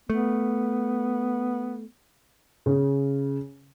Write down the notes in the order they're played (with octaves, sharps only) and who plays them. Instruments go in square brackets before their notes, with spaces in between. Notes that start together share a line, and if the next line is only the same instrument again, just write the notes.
[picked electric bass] A3 [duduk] B3
[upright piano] C#3